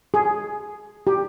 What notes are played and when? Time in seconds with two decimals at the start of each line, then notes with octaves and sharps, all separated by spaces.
0.14 G#4
1.07 G4